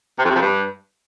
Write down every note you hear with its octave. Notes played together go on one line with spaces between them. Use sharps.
C3
F2
C3
F2
G2